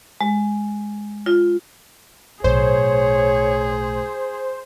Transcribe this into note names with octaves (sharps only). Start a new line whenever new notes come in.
G#3
F4
B1 A2 G#4 C5 C#5